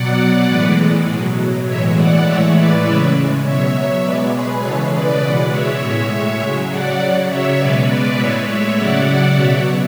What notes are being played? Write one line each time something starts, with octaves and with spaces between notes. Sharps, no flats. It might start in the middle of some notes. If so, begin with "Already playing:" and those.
Already playing: B2 F#3 D5 F#5
A2 E3 G#3 B4 D5
B2
F#3
A2 E3 G#3 C#5 E5
D5 F#5
A2 E3 G#3 C#5 E5
B4 D5
C#3 G#3 C#5 E5
B2 F#3 C#5 E5
B2 G#3 B4 D5
G#4 B4
C#3 E3 G#3 A4 C#5
B4 D5
B2 G#3 D5 F#5
C#5 E5
A2 G#3 C#5 E5
C#3 F#3
D5 F#5
C#3 F#3
C#5 E5
B2 G#3 B4 D5
B4 D5
A2 G#3 C#5 E5
C#5 E5
C#3 F#3 D5 F#5
B2 F#3 C#5 E5